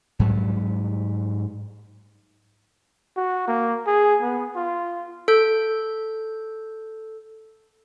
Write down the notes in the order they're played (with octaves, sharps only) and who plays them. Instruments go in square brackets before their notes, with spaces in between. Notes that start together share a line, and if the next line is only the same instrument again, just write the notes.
[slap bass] G#2 F#3 G3
[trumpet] F#4
A#3
G#4
B3
F4
[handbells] A4 G6